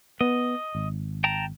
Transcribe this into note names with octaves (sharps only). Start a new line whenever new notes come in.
B3 D#5
G#1
G5 A5 A#5